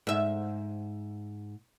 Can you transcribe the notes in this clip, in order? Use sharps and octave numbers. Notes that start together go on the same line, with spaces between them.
G#2 E5